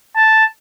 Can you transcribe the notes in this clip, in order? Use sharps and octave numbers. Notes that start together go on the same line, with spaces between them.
A5